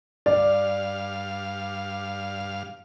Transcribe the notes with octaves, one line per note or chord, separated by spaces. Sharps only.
G2 D5 F5